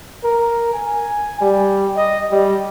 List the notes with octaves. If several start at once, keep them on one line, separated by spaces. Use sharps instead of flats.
A#4
G#5
G3
D#5
G3